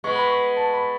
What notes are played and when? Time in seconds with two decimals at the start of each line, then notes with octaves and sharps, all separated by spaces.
0.04 G#3 B3 C#6
0.16 B5
0.27 C#6
0.57 A5
0.74 B5